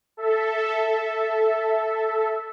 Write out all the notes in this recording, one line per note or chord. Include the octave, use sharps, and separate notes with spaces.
A4 E5